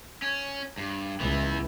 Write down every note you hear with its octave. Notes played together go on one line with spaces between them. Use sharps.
C#4
G2
C#2 E3 B3 E4